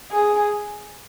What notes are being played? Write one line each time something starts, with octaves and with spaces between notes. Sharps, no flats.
G#4